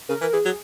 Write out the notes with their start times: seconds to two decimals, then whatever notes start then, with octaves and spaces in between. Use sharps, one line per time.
0.09 C#3 A#4
0.21 E3 A#4
0.33 E3 G#4
0.45 F#3